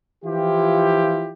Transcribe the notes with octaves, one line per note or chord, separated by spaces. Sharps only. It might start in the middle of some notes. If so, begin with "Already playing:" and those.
E3 F3 E4 F4 G4